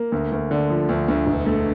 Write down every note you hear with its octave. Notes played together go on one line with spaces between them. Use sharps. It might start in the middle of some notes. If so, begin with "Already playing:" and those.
Already playing: A#3
D2
D2
D3
F3
D2
D2
E1
A3